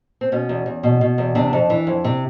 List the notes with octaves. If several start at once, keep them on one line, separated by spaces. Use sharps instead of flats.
C4
B2 C#4
E2
E2
B2
B2
E2
C3 D4
F2
E3
F2
C3